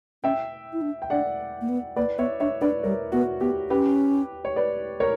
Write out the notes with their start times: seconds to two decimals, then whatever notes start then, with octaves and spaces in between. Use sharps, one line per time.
0.23 C#4 E5 G5
0.73 E4
0.81 D4
1.02 G5
1.10 D4 D5 F#5
1.61 A#3
1.69 B3
1.96 A#3 B4 D5
2.18 B3 C#5 E5
2.40 D4 C#5 E5
2.61 D4 B4 D5
2.83 G3 A#4 C#5
3.12 B3 F#4
3.41 B3 G4
3.70 C#4 G4 B4
4.45 C#5
4.56 B4 D5
5.00 A#4 C#5